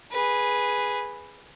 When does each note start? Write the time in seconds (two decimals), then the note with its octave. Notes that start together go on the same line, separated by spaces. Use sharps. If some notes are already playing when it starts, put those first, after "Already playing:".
0.11 G#4 B4